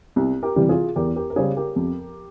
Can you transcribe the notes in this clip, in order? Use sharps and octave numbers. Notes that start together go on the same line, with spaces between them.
C2
G4 A#4
C3 E3 G3
F4 G#4
E2 G4 A#4
G4 A#4
A#4
C#3 G3 G#4 C5
G4 A#4
F2